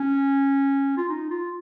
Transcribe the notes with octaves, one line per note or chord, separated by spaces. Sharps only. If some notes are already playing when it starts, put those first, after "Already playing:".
Already playing: C#4
F4
D#4
F4